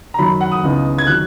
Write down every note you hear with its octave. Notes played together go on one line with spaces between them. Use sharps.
A#5
F#2 D#3 F#3 B5
F#5
D#6
C#2 C#3 E3 B3 D#4
G#6
D#3 F#3 F#6